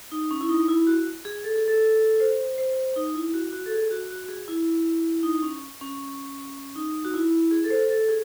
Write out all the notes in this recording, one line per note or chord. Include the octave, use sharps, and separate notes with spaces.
D#4
C#4
E4
D#4
E4
F#4
G#4
A4
G#4
A4
C5
C5
D#4
E4
F#4
F#4
A4
G#4
F#4
F#4
F#4
G#4
E4
D#4
C#4
C#4
D#4
F#4
E4
G#4
A4
C5
A4
G#4